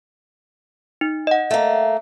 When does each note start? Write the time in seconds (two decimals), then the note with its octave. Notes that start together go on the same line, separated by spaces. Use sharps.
1.01 D#4
1.27 D#5 F#5
1.51 A3 A#3